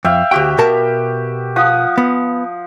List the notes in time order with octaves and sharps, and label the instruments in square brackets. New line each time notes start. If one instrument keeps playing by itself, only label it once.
[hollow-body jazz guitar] F2 [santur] E5 F5 G5
[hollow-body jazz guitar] D2 G5 [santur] F#4 G4
[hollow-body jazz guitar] B2 A#4 A5
[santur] F3 F#5 D#6
[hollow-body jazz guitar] B3